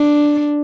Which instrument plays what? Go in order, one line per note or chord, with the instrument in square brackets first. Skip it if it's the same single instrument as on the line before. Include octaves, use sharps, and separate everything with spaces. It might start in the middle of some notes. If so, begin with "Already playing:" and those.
Already playing: [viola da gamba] D4